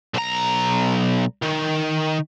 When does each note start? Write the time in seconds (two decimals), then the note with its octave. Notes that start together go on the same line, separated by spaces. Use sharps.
0.14 B1 A#5
1.43 D#3